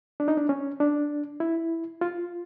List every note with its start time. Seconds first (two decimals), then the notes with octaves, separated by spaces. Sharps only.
0.20 D4
0.28 D#4
0.37 D4
0.49 C#4
0.80 D4
1.40 E4
2.01 F4